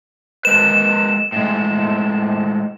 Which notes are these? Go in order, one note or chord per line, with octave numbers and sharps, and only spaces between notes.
G#3 A#4 B4 E7
A2 G#3